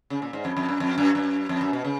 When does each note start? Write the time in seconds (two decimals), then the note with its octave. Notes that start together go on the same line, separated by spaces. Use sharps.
0.10 C#3
0.22 A#2
0.33 G#2
0.45 F2
0.57 F2
0.69 F#2
0.80 F2
0.98 F#2
1.15 F#2
1.49 F2
1.61 F#2
1.73 B2
1.85 C#3